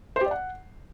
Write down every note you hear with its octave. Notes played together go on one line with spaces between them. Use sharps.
C5
G4
D5
F#5